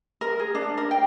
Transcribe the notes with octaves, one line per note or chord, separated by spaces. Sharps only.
A#4
G#4
D4
A#4
G5